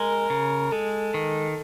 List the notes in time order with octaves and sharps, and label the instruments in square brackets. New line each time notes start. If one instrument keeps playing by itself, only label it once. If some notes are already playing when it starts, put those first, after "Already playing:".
Already playing: [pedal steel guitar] G#3 [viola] A#4
[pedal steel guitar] C#3
[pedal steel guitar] G#3 [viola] A4
[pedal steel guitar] D#3